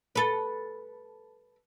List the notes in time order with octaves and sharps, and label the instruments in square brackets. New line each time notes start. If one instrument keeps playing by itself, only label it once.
[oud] A4 B4